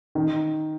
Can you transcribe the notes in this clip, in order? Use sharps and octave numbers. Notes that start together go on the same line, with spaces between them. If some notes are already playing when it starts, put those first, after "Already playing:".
D#3